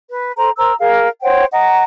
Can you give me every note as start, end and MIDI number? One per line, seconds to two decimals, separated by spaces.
0.10 0.31 71
0.37 0.51 69
0.37 0.51 72
0.37 0.51 82
0.58 0.73 70
0.58 0.73 72
0.58 0.73 82
0.58 0.73 88
0.79 1.08 68
0.79 1.08 70
0.79 1.08 77
1.21 1.45 72
1.21 1.45 73
1.21 1.45 78
1.21 1.45 79
1.52 1.84 75
1.52 1.84 78
1.52 1.84 82